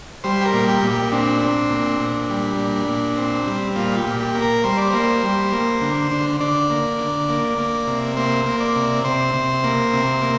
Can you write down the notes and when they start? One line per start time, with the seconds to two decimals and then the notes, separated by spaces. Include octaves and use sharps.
0.24 G3 C5
0.41 G4
0.45 A#4
0.53 A#2
0.68 G4
0.82 A#2
0.90 G4
1.12 C4 D4
1.41 C4
1.70 A#2
2.00 A#2
2.30 G3
2.59 A#2
2.88 A#2
3.17 C4
3.47 G3
3.76 A#2 F4
3.99 G4
4.06 A#2
4.20 G4
4.35 A#3
4.42 A#4
4.64 G3 C5
4.77 D5
4.90 A#3 C5
5.23 G3
5.52 A#3
5.81 D3
6.11 D3
6.40 D3 D5
6.70 A#3
6.99 D3
7.29 A#3
7.58 A#3
7.87 C3
8.17 A#3 C5
8.46 A#3
8.60 D5
8.76 C3
9.04 C3 C5
9.34 C3
9.64 A#3
9.93 C3
10.22 A#3